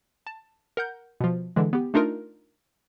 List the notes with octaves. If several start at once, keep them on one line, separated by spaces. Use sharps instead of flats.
A5
A#4 F#5 G6
B2 F3
D3 E3 G#3
B3 G4
A3 D4 D#4 F4 A#4